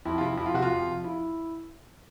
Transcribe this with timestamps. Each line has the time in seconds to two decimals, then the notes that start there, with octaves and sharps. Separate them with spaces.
0.05 F2 E4
0.18 F4
0.21 C3 F3 E4
0.37 F2 E4
0.46 F4
0.54 C3 F3 F#4
0.62 F4
0.71 F2
0.88 C3 F3
1.04 E4